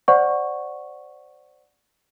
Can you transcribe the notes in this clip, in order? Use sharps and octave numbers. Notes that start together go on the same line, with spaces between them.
C5 D5 F#5 C#6